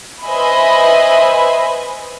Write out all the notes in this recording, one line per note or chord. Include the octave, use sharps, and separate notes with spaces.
B4 C5 D#5 E5 G#5 B5